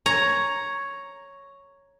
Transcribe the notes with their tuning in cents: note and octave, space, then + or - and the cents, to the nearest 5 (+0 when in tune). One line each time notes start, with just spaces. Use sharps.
C#5 +0 A#5 +0